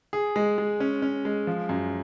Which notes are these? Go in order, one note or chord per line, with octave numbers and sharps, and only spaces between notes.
G#4
G#3
G#3
C#4
C#4
G#3
F3
F#2